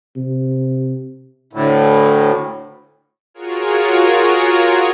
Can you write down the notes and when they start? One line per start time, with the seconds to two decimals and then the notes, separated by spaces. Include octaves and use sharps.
0.16 C3
1.53 D2 A2
3.34 F4 F#4 G#4 A#4 C#5